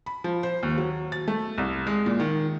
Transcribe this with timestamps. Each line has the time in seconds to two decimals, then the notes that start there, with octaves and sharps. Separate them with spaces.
0.06 B5
0.24 F3
0.43 C5
0.63 D#2
0.78 F#3
1.12 A6
1.28 A3
1.58 C2
1.87 G#3
2.06 A#2
2.20 D#3